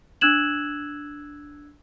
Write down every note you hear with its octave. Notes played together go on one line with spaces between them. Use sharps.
D4 E6 F#6 G#6 E7 F#7